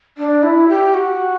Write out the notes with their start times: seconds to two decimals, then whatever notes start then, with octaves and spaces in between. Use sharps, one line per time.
0.18 D4
0.43 E4
0.69 G4
0.94 F#4